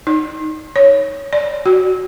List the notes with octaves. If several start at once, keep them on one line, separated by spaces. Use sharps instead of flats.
D#4
C#5
D5
F#4